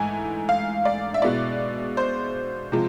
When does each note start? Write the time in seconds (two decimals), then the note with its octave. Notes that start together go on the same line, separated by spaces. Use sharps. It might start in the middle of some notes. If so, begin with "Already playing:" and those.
Already playing: G#2 E3 A3 E4 G#5
0.49 F5
0.85 D5
1.14 E5
1.22 B2 G#3 B3 E4 D5
1.97 C5
2.72 C3 F3 G#3